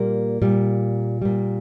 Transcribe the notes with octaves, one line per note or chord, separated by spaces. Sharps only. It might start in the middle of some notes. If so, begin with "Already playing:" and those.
Already playing: A#2 G3 A#3
A#2 G3
A#2 G3